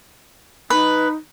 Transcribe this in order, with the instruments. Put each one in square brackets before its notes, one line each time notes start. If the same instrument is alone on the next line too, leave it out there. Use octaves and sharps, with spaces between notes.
[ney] D#4 [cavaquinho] B4